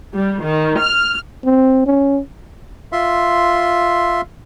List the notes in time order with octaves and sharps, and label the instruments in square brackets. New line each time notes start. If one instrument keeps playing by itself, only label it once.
[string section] G3
D#3
F6
[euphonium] C4
C#4
[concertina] F4 E5 C6